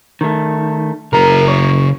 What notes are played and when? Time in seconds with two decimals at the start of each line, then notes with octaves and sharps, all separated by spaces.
0.21 D#3 A3
1.13 F#1 C#3 A#4 A#5
1.48 C#5